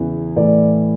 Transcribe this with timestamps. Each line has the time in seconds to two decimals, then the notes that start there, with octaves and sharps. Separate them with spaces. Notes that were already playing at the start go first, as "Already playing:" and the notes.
Already playing: E2 C#3 E3
0.36 A2 E3 D5